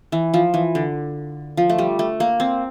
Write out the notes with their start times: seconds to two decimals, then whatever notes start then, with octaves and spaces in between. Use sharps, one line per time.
0.12 E3
0.34 F3
0.54 E3
0.75 D3
1.57 F3
1.70 A3
1.78 G3
1.99 A3
2.20 A#3
2.40 C4